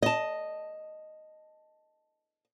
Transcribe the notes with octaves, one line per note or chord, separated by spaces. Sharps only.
D#5 A5